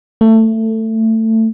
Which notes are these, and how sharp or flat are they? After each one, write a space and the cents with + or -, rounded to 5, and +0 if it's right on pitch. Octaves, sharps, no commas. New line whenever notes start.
A3 +20